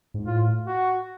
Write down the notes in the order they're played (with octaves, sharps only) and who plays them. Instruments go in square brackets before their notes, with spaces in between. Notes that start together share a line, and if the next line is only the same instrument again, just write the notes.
[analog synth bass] G#2
[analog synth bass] A2 [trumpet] F4
[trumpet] F#4